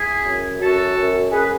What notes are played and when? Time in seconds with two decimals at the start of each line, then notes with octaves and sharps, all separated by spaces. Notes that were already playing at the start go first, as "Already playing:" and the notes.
Already playing: E4 G#4
0.25 F#2
0.60 F#2 F#4 A4
0.96 F#2
1.31 F#2 G#4 B4